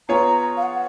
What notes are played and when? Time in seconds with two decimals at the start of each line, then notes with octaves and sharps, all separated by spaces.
0.09 B3 F4 G#4 C#5 A#5
0.57 F5
0.63 F#5